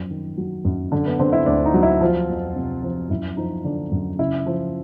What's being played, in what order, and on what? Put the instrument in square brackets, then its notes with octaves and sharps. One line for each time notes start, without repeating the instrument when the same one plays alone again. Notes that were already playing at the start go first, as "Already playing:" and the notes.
Already playing: [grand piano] F#2 F3
D#3
F#3
F#2
D3
B3
D3 C4
E4
D2 D4
D#4
F#3
E4
F3 F4
F2
C3
F3
F#2 E4
F3 D#4
D3 D4
F#2
C#3 E4
F3